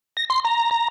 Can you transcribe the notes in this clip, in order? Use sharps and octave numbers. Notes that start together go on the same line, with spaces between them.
A#6
C6
A#5
A#5